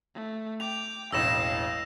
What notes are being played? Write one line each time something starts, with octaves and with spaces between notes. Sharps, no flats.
A3
G5 D6 F7
E1 A1 D#5 F5 E6 A#6 E7